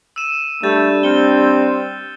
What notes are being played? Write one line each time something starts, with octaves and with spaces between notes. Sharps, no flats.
E6 D#7 E7
G3 A3 D4 G6 A6
C4 F6 C#7 G7